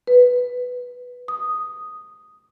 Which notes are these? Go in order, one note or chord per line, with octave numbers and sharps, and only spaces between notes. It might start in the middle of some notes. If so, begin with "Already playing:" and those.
B4
D#6